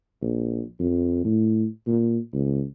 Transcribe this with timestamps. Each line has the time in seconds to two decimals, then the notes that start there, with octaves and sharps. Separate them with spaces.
0.22 A#1
0.79 F2
1.25 A2
1.87 A#2
2.34 C#2